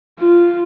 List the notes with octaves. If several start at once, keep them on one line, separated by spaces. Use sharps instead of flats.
F4